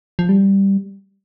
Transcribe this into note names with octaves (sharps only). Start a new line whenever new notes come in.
F3
G3